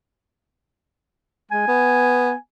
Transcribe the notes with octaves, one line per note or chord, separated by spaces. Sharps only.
G#3 G#5
B3